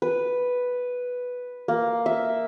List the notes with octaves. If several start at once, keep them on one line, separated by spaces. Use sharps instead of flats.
B4
A#3
E5